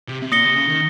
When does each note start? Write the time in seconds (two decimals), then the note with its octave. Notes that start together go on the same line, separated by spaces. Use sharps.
0.08 C3
0.22 C3
0.31 A#2 D#6 A#6 C#7 G7
0.44 C3
0.55 C#3
0.68 D#3